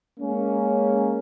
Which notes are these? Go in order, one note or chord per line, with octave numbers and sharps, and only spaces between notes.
G#3 A#3 C#4